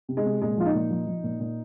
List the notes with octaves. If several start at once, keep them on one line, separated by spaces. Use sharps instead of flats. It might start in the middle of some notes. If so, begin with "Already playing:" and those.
C3
G#3
C3
A#2 G#3
F3 F4
D#4
A#2
F3
F3
A#2
A#2